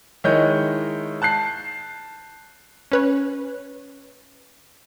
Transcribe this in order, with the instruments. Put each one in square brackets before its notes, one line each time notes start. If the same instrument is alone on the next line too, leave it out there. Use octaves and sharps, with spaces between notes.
[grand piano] D#3 G#3 E4 C#5 D#5 G6
A5 F#6 G6 C7
[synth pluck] C#4 B4 C#5